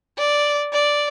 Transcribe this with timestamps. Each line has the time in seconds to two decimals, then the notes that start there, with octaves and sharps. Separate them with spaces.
0.18 D5
0.73 D5